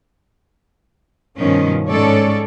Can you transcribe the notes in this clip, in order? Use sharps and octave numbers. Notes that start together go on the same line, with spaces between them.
G2 B2 D#3 F3 C#4
G#2 G#3 C#4 A4 C#5 D5